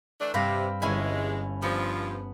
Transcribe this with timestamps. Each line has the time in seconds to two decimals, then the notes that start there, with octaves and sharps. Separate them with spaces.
0.20 E3 A3 D4
0.34 G2 C3 C4 B4 F5 A#6
0.82 G1 D#2 E3 G#3 C#4 E4 G#5 B5
1.62 G2 F3 B3